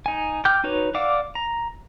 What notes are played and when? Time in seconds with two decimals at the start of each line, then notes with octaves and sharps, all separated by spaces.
0.06 D#4 G#5
0.45 G5 D6 F6 G6
0.64 D#4 F#4 B4 C#5
0.95 D5 F5 F#5 D6 E6
1.35 A#5